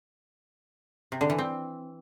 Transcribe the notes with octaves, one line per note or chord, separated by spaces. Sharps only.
C3
D3
E3
C4